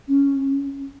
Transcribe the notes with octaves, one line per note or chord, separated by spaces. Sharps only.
C#4